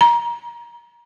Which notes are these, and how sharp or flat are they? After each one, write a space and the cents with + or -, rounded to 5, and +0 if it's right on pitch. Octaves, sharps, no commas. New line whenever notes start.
A#5 +25